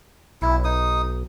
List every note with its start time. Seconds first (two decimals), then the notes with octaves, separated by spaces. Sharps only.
0.42 B1 E4
0.64 D#4 D#6